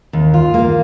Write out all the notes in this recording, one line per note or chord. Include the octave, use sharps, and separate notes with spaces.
D#2
F4
A#3